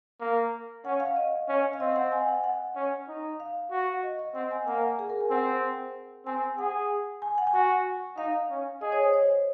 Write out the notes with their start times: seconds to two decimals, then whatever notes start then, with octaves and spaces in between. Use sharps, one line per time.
0.20 A#3
0.85 C#4 F#5
1.00 F5
1.16 D#5
1.49 C#4
1.73 F5
1.80 C4 D#5
1.96 F#5
2.12 G#5
2.28 F#5
2.44 F#5
2.76 C#4
3.08 D#4
3.40 F5
3.71 F#4
4.03 D#5
4.19 D#5
4.35 C4 F#5
4.51 G#5
4.67 A#3 F#5
4.74 G#5
4.81 F#5
4.99 G#4
5.10 A#4
5.20 G#5
5.31 C4 F#5
6.26 C4 G#5
6.58 G#4 F#5
7.22 G#5
7.38 F#5
7.47 G#5
7.54 F#4 F#5
8.18 D#4 F5
8.50 C#4
8.81 G#4 D#5
8.92 C#5
9.03 C5
9.13 C#5